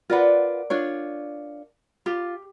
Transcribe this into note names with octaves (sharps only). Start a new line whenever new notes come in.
F4 A#4 B4 D5 F#5
D4 F4 C#5
F4 G4